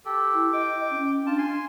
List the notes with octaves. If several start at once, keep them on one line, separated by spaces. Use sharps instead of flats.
G4 A4
E4
D#5 G5 D6
C#4
D4 F4 A5
G#5 C6